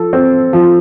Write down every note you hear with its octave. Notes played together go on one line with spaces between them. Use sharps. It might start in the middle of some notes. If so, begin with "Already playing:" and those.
Already playing: F3 A4
C4
F3